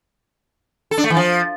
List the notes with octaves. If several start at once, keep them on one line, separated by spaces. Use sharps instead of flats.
A4
D4
A3
E3
F3